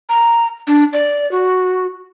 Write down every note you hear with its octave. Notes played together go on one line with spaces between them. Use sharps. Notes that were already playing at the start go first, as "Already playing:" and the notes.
A#5
D4
D5
F#4